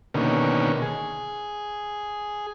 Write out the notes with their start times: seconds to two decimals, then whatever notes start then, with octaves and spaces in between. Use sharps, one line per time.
0.14 B2 D3 D#3 A#3 C#4
0.82 G#4